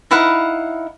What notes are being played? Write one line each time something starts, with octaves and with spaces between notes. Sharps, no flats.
D#4 E4 F5 F#5